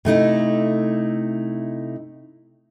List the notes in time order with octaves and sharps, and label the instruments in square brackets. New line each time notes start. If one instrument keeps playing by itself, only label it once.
[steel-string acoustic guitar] C3 A3 D#4 E4